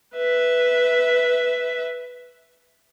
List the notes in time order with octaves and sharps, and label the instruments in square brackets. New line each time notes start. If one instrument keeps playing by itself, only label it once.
[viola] B4 E5